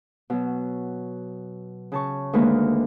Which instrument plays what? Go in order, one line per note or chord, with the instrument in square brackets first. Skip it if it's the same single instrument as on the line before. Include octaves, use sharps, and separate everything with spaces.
[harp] B2 F#3
C#3 A5 C#6
D2 D#3 G#3 A#3 B4